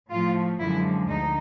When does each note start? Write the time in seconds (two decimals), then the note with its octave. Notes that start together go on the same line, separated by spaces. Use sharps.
0.10 A2 F3 A3 F4
0.59 F#2 D3 F3 G#3 E4
1.08 D2 D3 D#4